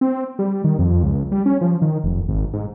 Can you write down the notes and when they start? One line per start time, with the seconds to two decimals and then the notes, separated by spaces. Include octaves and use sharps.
0.01 C4
0.39 G3
0.64 D#3
0.79 F2
1.03 C#2
1.32 G3
1.46 C#4
1.61 F3
1.82 D#3
2.04 F1
2.29 G#1
2.53 G#2